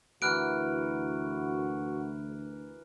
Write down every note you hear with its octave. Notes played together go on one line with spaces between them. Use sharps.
D2 E3 F#4 A#4 F6 F#6 D7